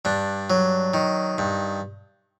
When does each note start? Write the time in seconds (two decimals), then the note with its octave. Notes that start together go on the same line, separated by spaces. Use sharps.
0.05 G2 D4
0.50 F#3
0.94 D#3
1.38 G2